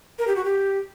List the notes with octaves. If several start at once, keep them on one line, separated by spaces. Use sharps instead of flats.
A#4
G4
F#4
G4